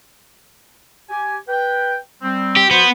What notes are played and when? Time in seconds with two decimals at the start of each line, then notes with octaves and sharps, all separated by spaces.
1.10 G4 G#5
1.48 B4 G5
2.22 G3 C4
2.56 G4
2.71 F3 B3 F#4 C5